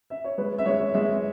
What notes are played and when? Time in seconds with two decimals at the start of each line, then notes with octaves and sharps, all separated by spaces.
0.10 E5
0.24 C#5
0.38 G#3 B4
0.58 E5
0.65 G#3 C#5
0.94 G#3 E5